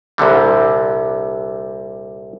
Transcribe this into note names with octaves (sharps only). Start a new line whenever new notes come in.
C2 A#2 D3 G3